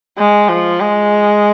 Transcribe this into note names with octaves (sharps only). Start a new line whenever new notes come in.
G#3
F3
G#3